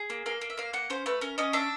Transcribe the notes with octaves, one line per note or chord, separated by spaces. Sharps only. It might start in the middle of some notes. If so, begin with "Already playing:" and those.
Already playing: G#4
A#3
A#3 F5
A#3
E5
A#3 F5
A#3 F#5
C#4 C5
A3 B4
C#4 A#4
C#4 D#5
D4 E5